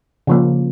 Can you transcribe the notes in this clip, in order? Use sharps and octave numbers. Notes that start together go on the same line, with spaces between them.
C#3 F3 A#3